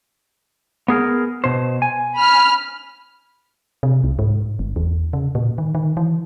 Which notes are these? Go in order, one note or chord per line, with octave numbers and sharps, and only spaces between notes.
B3 G#4 A#4
B2 C5
G#5
B5 F6
C3
C2
G#2
G1
E2
C#3
A#2
D#3
D#3
E3